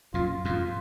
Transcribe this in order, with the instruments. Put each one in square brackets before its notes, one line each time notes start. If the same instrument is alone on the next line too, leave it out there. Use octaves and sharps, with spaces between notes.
[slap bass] F#2 A#2 [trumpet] F4
[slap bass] F2 G#2 [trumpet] F4